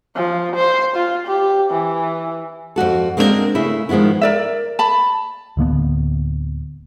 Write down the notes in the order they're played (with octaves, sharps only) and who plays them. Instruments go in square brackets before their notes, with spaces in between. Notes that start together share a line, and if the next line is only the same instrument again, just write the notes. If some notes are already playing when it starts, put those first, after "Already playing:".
[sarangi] F3
C5
F4
G4
E3
[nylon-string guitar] F2 A#2 F#4 A4
G#3 A#3 C4 D4 E4 A#4
C#3 A3 C#4 E4
D#3 F3 G#3 B3 E4
[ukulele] A#4 D5 E5
A5 B5
[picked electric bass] D1 D3 A#3 B3